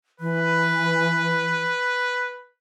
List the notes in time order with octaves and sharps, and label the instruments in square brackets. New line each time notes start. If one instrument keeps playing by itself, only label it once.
[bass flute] E3 [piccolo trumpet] B4